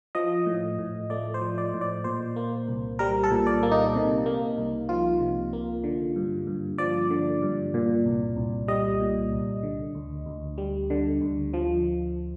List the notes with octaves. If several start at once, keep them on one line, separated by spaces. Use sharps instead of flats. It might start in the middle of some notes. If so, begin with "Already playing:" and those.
F3 D#5
A2
A2
A3 D5
C5
F3
D5
A2
D5
A#2 C5
A#3
C2
G3 A#4
A4
A#2
D5
A#3
D#4
C3
A#3
C2
F3 F4
C3
A#3
D3
G2
G2
F3 D5
D3
G2
A#2
C2
C2
G3 D#5
A#2
C2
D3
D2
D2
G3
D3
D2
F3